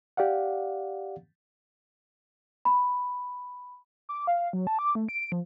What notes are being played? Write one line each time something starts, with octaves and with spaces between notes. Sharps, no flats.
G4 D5 F5 F#5
B5
D6
F5
F#3
A5
D6
A3
D7
F3